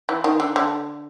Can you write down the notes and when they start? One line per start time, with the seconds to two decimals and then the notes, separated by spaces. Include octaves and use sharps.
0.09 E3
0.24 D#3
0.40 D3
0.56 D3